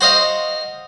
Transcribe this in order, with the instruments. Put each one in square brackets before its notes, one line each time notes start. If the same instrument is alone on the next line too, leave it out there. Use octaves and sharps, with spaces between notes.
[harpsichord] F#4 C5 D#5 F5